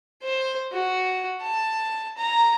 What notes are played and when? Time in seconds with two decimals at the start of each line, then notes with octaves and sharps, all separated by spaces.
0.23 C5
0.72 F#4
1.42 A5
2.17 A#5